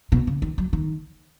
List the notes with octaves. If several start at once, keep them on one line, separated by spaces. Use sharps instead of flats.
B2
C#3
D#3
F#3
D#3